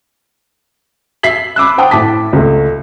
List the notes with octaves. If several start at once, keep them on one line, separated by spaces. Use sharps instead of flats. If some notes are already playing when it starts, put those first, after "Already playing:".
E5 B6 C7 F#7
B5 D6 E6 F#6
C5 F#5 G5 A5 D#6
A2 A5 D6 B6
C#2 A3